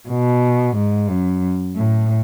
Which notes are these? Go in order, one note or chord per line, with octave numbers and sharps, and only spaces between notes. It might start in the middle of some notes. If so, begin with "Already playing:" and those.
B2
G#2
F#2
A2